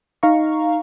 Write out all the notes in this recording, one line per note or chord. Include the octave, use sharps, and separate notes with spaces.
D#4 F5 A#5 C#6